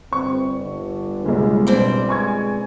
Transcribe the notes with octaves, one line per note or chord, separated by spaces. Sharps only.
G1 C4 C#6
D3
F#1 B1 G#3
B2 C4 D5
G#3 G#5 C#6 G#6